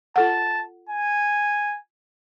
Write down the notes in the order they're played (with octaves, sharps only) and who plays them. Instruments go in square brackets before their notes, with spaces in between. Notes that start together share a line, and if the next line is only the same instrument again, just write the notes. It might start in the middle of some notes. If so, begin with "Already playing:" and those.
[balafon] F4 A4 F#5 [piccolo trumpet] A5
[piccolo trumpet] G#5